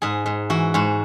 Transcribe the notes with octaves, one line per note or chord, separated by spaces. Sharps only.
G#2 G#4
G#2
E3 F#4
G#2 F#4